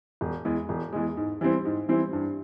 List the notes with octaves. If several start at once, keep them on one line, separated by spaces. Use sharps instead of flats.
E1
E2 E3 G#3
E1
E2 E3 G#3
G#2
E3 G3 C4 E4
G#2
E3 G3 C4 E4
G2